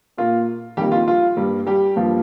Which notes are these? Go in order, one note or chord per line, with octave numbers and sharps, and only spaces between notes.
A#2 A#3 F4
F2 D#3 G3 A#3 G4
F4
F4
G2 G3 A#3
G3 G4
G2 F3 A#3